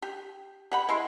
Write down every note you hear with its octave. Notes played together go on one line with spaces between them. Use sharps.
G4
G4 F#5 B5
G#3 E4 C6